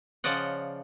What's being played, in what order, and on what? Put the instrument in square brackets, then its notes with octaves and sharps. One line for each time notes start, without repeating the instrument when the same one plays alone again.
[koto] C#3 F3 D5 D#5 F#5